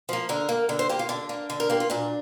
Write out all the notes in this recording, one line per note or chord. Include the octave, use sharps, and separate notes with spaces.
F3 A#3
D3 A#4
A#3
D3
C5
A#3 G4
F4
D3 D4
A#3
D3
A#4
A#3 G4
F4
A#2 D4